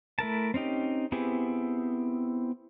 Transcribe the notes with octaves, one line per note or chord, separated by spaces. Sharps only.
A3 E4 A#4 A5
C4 C#4 D#4 G4
B3 C4 E4 G4 G#4